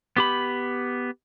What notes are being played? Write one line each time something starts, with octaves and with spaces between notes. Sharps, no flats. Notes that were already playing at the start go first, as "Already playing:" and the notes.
B3 G4 B5